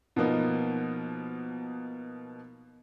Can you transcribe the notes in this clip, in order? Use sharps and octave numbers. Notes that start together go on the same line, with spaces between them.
B2 F3 A#3 B3 D#4